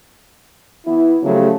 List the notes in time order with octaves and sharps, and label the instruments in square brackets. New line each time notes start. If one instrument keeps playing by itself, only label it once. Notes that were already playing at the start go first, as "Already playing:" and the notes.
[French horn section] E3 B3 E4
C#3 F3 F#3 A3 G4